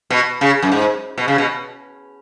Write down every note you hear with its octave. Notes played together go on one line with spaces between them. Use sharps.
B2
C#3
F#2
G#2
B2
C#3
B2